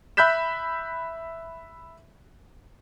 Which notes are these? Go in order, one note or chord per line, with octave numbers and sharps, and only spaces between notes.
E5 B5 F#6 G6 B6 E7